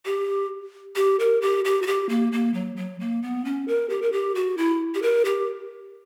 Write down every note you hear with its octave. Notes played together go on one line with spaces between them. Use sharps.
G4
G4
A#4
G4
G4
F#4
G4
A#3
A#3
F#3
F#3
A#3
B3
C#4
A#4
G4
A#4
G4
F#4
E4
G4
A#4
G4